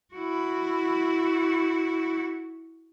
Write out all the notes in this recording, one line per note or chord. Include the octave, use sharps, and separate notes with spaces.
E4 F#4